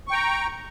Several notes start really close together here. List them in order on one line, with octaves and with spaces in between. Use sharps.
C#6 G5 A#5